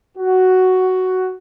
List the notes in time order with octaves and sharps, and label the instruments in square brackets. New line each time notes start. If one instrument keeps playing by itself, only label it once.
[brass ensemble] F#4